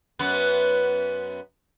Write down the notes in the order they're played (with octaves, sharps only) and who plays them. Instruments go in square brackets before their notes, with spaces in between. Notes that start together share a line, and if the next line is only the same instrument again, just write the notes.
[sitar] F#2 B3 B4